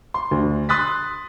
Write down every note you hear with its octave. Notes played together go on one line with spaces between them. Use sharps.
C6
D2
C6 D#6 F#6 A6 B6